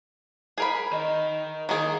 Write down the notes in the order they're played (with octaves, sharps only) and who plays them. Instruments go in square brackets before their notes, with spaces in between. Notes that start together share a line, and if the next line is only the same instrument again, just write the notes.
[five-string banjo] G#4 A#4 B5
[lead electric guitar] D#3 D#5
[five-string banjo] D#3 A#3 G#4